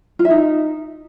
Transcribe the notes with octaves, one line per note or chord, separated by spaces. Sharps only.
F4
E5
D#4